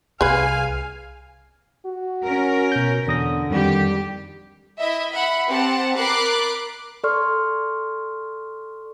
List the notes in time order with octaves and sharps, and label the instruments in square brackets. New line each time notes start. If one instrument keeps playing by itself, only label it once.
[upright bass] C2 [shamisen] G#4 B4 [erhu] F5 [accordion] G#5
[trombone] F#4
[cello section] C#4 A#4
[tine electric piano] B2 G6
[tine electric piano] E2 D#6 A#6 [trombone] D3
[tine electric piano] F2 D#3 [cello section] G3 G4
[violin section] E4 D#5 E5
E5 F#5 B5
C4 G4 F#5 A5
A#4 B5 D6 F#6 A6 C7
[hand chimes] A4 D5 C6 C#6 F6